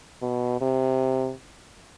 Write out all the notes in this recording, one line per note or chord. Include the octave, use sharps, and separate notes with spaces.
B2
C3